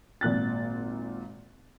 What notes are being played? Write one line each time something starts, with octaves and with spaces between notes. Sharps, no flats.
G#1 A#2 F#6 A6